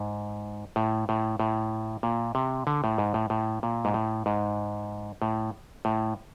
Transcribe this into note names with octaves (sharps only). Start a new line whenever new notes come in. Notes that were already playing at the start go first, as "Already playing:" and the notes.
Already playing: G#2
A2
A2
A2
A#2
C3
D3
A2
G#2
A2
A2
A#2
G#2
A2
G#2
A2
A2